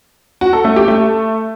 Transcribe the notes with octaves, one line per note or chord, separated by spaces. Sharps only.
F#4
A4
A3
G4
A3